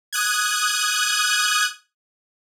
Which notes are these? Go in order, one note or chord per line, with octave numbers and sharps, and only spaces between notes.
D#6 F#6 G#6